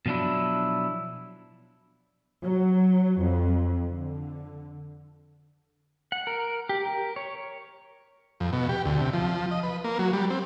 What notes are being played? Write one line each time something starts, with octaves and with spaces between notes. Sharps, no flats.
B2 F3 F#3 D4 E4
F#3
F2
D3
F#5
A#4
G4
A#4
C#5
F2
B2
G4
D2
C3
F3
D#5
B4
A#3
F#3
G3
C4